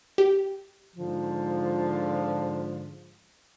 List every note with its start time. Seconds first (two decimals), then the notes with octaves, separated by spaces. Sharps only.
0.18 G4
0.96 G#2 D3 F3